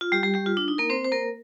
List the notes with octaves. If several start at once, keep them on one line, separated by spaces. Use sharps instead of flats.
F4
G3 G4
G3 G4
G3 G4
F4
D4
D#4
A#3 A#4
C4 C5
C5
A#3 A#4